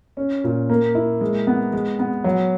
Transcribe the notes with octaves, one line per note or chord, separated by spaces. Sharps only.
C#4
A#2
A#3
E4
G#3
B3
G#3
B3
F#3